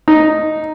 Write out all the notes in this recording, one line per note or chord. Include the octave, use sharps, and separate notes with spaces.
D#4